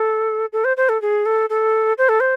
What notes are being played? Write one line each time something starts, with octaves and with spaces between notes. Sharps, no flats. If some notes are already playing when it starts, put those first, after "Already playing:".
Already playing: A4
A4
C5
C5
A4
G#4
A4
A4
C5
A4
C5